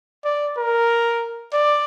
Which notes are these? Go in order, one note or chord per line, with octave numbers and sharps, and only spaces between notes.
D5
A#4
D5